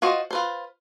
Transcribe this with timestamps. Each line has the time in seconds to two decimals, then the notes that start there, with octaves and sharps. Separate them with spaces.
0.02 F4 F#4 C5 D#5
0.31 F4 B4 C5